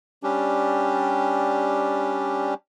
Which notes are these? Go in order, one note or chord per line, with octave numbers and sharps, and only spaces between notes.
G3 C#4 D4 G4